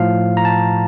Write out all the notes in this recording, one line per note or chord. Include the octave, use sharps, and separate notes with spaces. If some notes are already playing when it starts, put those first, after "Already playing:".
Already playing: A2 F3 F5
A#5
A5